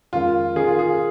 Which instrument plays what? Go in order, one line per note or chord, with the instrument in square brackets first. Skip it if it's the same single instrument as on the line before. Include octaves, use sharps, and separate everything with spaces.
[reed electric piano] F2 D#3 G#3 C#4 A#4 [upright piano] F4
[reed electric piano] D#3 C#4 A#4 [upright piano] G#4
[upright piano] F4
G#4